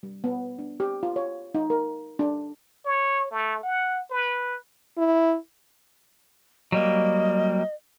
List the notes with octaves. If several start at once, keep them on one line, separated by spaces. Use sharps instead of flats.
G3
B3
D4
G4
F4
C#5
D#4
A#4
D4
C#5
A3
F#5
B4
E4
F#3 G3 A#3 D#5